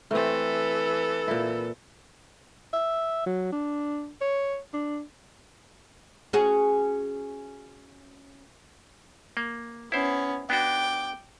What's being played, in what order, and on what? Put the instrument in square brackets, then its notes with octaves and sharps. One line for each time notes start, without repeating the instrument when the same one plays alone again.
[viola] E3 A4 [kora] A3 C4
[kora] A#2 E4
[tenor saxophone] E5
F#3
D4
C#5
D4
[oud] C#4 F#4 G#4
[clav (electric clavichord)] A#3
[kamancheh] B3 C#4 [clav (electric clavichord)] E4 C5
[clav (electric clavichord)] B3 D4 F#4 [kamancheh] G5 D6